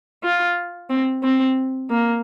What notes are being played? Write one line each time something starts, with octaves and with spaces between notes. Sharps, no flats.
F4
C4
C4
A#3